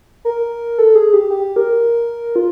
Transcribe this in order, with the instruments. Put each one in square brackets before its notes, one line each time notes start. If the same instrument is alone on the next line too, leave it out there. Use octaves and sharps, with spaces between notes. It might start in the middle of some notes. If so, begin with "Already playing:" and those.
[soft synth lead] A#4
A4
G#4
G4
G4
A#4
F4